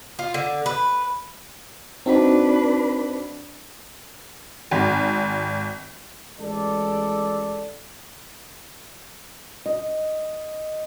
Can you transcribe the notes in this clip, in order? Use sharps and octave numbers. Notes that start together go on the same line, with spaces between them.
F4
D3
B4
C4 D4 D#4 F#4 B4
G#1
A1 G#3 A4 D5
D#5